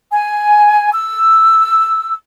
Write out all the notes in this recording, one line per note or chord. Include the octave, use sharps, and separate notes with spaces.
G#5
E6